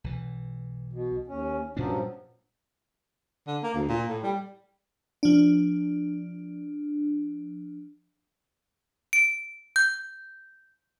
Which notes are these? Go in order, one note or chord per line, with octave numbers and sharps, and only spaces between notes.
B1 E3
B2
D#2 C#4
G2 A#2 F3 F#3 C#4 D4
D3
A#3
D2
A#2
A2
G3
F3 D4
D7
G6